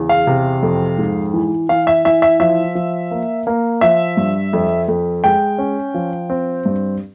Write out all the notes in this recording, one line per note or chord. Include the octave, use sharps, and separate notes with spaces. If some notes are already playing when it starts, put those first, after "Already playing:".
Already playing: E2 C#3
F5
C3
F2
G#2
E3
E3 F5
E5
E3 E5
E5
F3 E5
F3
A#3
A#3
F3 E5
G2
F2
F2
G#3 G5
C#4
F3
C4
G2